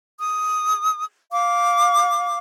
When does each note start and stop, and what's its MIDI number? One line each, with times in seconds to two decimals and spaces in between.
0.19 1.04 87
1.31 2.38 77
1.31 2.38 86